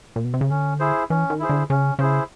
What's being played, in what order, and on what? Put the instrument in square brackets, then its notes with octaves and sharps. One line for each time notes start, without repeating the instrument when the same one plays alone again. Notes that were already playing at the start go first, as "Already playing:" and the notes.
[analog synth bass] A#2
B2
C3
C#3
[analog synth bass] D3 [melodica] C#4
[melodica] E4 G#4 C5
[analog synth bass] E3 [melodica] C#4
[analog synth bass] D#3
[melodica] E4 G#4 C5
[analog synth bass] D3
[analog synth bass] C#3 [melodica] C#4
[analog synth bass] C#3 [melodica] E4 G#4 C5